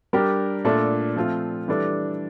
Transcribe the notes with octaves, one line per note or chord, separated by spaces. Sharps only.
G3 D4 G4 A#4
A#2 A3 D4 A4
F3 A3 C4 F4
E3 G3 D4 A4